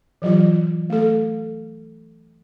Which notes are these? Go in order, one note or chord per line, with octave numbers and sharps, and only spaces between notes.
E3 F#3 F4
A3 A4